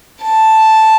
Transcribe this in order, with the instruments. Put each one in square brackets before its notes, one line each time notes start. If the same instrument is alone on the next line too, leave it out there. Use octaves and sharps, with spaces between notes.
[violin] A5